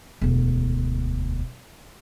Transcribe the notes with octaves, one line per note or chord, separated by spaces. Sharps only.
E1 D2